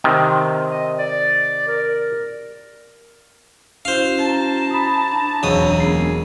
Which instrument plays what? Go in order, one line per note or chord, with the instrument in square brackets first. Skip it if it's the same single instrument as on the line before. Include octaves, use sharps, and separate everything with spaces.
[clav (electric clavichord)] C3 D#3
[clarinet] D#5
D5
A#4
[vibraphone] C#4 E4 F#4 [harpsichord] C5 F5 [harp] D#7
[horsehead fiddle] A5 A#5
[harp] B5 D#6
[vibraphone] D4
[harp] E1 E6 [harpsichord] C#2 F#3 D#6 [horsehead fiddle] C4 C#4
[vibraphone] G#3 B3 G#4 [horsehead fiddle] A#3